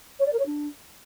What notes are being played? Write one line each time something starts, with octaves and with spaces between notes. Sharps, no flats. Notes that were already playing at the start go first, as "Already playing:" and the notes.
C#5
D5
A#4
C#5
D4